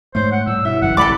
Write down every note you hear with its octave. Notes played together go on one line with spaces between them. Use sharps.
G#2 A3 C5 C#5
F#5
A2 G3 E6
G2 B2 E4 E5
G1 F#2 E3 F#5
G#1 F#2 C#3 A4 D5 B5 D6